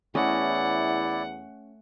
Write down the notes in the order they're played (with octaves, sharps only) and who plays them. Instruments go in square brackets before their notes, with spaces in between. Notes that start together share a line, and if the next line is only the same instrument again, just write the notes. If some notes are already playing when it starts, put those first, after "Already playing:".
[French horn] E2 [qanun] A3 C#4 D#5 [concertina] E4 D5 [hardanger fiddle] F#5